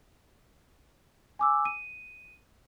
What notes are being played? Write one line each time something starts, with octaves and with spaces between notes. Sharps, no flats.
G#5 D6 E6
D#7